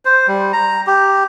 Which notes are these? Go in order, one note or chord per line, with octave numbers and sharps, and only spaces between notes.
C5
G3
A#5
G4